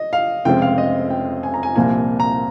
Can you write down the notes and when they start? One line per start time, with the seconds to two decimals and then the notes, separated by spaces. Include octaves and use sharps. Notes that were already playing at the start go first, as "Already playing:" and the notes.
Already playing: D#5
0.13 F5
0.45 F1 F2 C#3 G#3 C4 G5
0.62 F5
0.78 D#5
1.10 G5
1.43 G#5
1.54 A#5
1.63 G#5
1.76 C2 A#2 F3 A#3 G#5
2.20 A#5